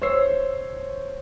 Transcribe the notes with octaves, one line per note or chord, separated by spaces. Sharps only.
C5 C#5 E6 C7